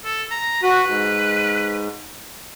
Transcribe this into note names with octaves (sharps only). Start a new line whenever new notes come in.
A4
A#5
F#4 B4
G#2